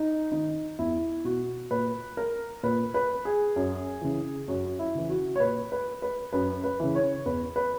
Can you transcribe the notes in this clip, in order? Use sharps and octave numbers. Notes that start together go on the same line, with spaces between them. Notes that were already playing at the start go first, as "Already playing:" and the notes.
Already playing: D#4
D#3 D#4
E2 E4
B2 F#4
A#2 B4
A#4
A#2 B4
B4
G#4
F#2
C#3 E3
F#2 F#4
E4
C#3 E3
F#4
C#5
A#2 B4
B4
B4
F#2 B4
B4
C#3 E3
C#5
E2 B4
B4